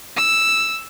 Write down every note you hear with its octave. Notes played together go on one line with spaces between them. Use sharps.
E6